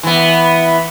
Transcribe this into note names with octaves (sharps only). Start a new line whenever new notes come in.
E3 B3